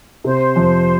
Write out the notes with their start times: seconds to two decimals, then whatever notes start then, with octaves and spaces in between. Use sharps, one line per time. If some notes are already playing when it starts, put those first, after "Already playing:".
0.24 C3 C5
0.56 F2